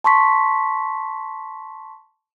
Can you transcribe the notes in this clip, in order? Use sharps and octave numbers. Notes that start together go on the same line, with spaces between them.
A5 C6 C#6 B6